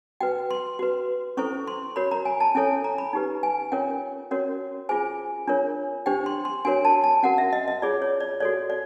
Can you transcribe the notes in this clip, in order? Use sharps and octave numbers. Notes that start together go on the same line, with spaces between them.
F#4 B4 G5
C6
F#4 B4
C#4 E4 A4 C5 C#6
C6
F#4 A#4 C#5 B5
A#5
G#5
A5
C#4 E4 A4 C#5 G#5
A#5
B5
D#4 G4 B4
G#5
C#4 F4 A#4 C#5 G5
C#4 F#4 A#4 C#5
F4 G#4 C5 G#5
D4 F4 A#4 C#5
D4 G4 C5 G5
C6
C6
D4 F#4 A#4 C#5 G#5
A5
A5
C#4 F#4 A#4 F#5
E5
D#5
D#5
F4 G#4 C#5 D5
C#5
D5
F#4 A4 C#5 D5
D5